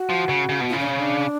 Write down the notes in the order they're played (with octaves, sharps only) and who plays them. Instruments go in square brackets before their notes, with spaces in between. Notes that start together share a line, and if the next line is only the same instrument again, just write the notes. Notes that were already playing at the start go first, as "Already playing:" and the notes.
Already playing: [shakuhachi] F#4
[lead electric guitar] F3
C#3
C#3
B2
[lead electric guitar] C#3 [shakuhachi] F4
[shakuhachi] D4
C#4
D4